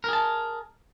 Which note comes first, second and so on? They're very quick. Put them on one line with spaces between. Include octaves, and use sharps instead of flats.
A#4 G#4 A5